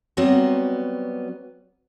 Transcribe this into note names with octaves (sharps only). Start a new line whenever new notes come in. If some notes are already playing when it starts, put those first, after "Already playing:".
F#3 G3 B3 C4 F#4